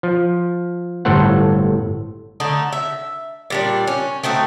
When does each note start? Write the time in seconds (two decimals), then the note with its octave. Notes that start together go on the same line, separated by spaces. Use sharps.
0.03 F3
1.05 G1 A2 A4 C5 F#5
2.40 D3 A3 D#4
2.73 E5
3.50 A#2 G3 D4
3.88 C#4
4.24 A3 C4 D#4 F#4